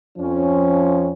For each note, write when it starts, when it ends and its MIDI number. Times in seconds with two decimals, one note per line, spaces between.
0.18 1.11 41
0.18 1.11 53
0.18 1.11 61